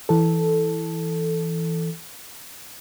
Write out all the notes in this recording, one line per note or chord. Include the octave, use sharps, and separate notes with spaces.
E3 A4